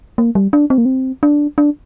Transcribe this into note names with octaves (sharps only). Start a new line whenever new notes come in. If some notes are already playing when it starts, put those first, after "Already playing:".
A#3
G3
D4
C4
A#3
C4
D4
D4